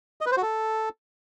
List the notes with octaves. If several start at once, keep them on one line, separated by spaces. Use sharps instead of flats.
D#5
B4
C5
F#4
A4